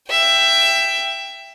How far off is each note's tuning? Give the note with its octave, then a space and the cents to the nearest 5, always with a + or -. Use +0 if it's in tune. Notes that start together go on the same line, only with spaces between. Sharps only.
E5 +15 G5 +10